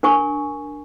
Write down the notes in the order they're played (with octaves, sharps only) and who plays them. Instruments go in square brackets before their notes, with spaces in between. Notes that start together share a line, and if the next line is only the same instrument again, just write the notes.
[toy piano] D4 A#4 G#5 C#6